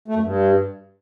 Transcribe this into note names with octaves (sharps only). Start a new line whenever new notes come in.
A3
F#2
G2